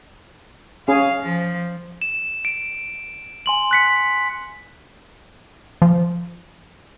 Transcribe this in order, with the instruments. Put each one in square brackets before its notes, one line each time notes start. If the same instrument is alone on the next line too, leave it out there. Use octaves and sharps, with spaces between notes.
[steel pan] C#4 G#4 [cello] F5
[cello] F3
[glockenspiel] E7
D7
G#5 C6 F#7
F#6 B6 C#7
[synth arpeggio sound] F3